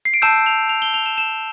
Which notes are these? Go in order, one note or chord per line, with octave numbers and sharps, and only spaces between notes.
C7
D7
A5 E6 G6 E7
F7
F7
G7
F7
E7
E7